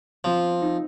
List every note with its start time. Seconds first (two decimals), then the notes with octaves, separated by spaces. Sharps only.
0.24 F3 C4
0.62 D#4